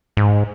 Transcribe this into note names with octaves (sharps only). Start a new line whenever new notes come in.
G#2